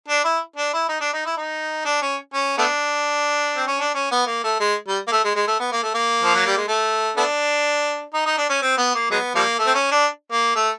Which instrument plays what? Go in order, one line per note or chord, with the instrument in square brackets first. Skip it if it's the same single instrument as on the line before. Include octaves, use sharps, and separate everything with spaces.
[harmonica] D4
E4
D4
E4
D#4
D4
D#4
E4
D#4
D4
C#4
C#4
A3 B3 D4
C4
C#4
D4
C#4
B3
A#3
A3
G#3
G3
A#3
A3
G#3
G#3
A3
B3
A#3
A3
A#3
F3
F#3
G3
G#3
A3
A3 B3 D4
D#4
D#4
D4
C#4
C4
B3
A#3
F#3 G#3 B3
F3 G3 A#3
A3
C4
C#4
D4
A#3
A3